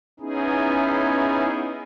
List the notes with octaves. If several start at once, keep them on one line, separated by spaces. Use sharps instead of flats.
B3 C#4 D#4 E4 G#4